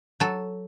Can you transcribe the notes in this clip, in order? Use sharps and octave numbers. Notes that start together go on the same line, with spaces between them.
F#3 A4